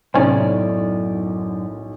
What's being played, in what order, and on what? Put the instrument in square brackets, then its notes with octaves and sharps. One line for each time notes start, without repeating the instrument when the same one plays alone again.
[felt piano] B1 D#4 [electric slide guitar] F#2 D5 [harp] A2 [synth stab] C3 C#4